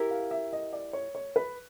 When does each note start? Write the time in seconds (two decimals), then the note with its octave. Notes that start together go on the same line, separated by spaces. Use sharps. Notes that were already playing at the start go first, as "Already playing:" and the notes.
Already playing: E4 G4 A#4
0.11 F5
0.31 E5
0.53 D#5
0.73 D5
0.93 C#5
1.15 C#5
1.36 B4